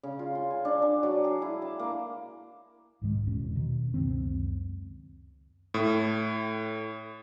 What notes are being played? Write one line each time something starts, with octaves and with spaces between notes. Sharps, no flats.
C#3
F4
C6
G#5
D4
A5
F#3
G#4
E4
A5
A#3
C2 G#2 D#3 G#3
E1 E2 B2 C#4
B2 D#3
C#2 F#2 D#3 C4
A2